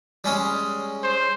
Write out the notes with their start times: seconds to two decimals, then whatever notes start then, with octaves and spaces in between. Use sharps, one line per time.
0.24 G3 G#3 C#4
1.04 C5